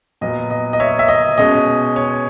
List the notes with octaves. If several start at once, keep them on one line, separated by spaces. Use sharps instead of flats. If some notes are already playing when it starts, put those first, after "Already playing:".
A#2 F#3 B3 D#5
D#5
D#5
C#5 E5
E5
D#5
B2 G#3 C#4 D#5
C#5